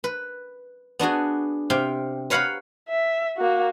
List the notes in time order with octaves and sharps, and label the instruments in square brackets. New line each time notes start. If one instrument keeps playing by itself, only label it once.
[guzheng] B4
B3 D4 F#4 G#4
C3 G4 F5 G5
B4 C#5 F5 F#5 A#5 B5
[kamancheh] E5
A#3 F#4